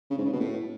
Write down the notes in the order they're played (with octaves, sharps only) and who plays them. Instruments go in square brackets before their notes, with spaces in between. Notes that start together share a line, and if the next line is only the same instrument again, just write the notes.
[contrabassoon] C#3
G#2
C#3
B2
A2